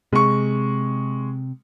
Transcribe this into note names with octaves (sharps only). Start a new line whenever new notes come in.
C3 G#3 C#6